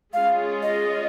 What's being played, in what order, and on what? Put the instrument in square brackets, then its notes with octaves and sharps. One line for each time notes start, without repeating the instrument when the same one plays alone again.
[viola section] G#3 C#4 F4 G#4 [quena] F5
[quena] D#5